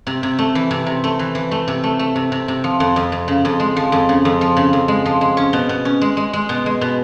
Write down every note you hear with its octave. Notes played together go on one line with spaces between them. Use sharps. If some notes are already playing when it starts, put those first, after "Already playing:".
C3
C3
A3
E3
C3
C3
A3
E3
E3
A3
C3
A3
A3
C3
C3
C3
F3
F2
F2
F2
C#3
F2
G#3
F3
F2
C#3
F2
F3
C#3
F2
G#3
F3
G#3
C#4
B2
B2
C#4
G#3
G#3
G#3
B2
G#3
B2